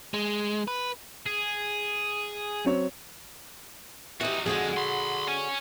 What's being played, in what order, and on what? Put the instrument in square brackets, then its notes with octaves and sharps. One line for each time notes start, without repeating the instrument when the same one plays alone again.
[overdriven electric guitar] G#3
B4
[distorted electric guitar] G#4
[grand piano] F#3 C4 C#5
[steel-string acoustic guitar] E3 G4 [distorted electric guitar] D#4 F#4
[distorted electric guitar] F2 G#3 [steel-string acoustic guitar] D3 F#4 G#4
[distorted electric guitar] B5 C6
C#5 G#5